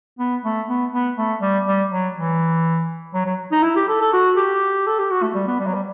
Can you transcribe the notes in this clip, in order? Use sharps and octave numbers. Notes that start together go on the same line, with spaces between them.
B3
A3
B3
B3
A3
G3
G3
F#3
E3
F#3
F#3
D#4
E4
G4
A4
A4
F#4
G4
A4
G4
F#4
A3
G3
B3
G3
F#3
G3